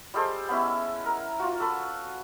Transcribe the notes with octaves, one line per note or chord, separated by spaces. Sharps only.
G3 G#3 A4 C5
B3 C#4 E4
A#4
F4 F#4
A4 B4